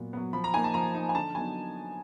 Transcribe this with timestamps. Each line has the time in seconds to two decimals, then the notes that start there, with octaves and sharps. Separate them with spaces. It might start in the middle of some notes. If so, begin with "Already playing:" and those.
Already playing: A#2 F#3 B3
0.13 F#3 B3
0.33 F3 B5
0.44 A#5
0.53 A#3 D#4 G#5
0.64 A5
0.74 F3 A#5
0.95 A#3 D#4
1.09 G#5
1.15 D3 A5
1.35 F#3 B3 D#4 G#5